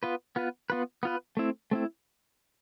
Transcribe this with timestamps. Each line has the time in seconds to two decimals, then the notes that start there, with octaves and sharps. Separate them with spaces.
0.03 B3 F4 B4
0.36 B3 F4 B4
0.70 B3 F4 B4
1.03 B3 F4 B4
1.37 A3 C4 E4
1.71 A3 C4 E4